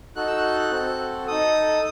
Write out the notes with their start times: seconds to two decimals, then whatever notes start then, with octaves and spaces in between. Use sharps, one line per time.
0.16 D#4 F#4 A4 F#6
0.27 E6
0.38 F#6
0.71 C4 F#4 A4
1.27 D#4 A4 D#6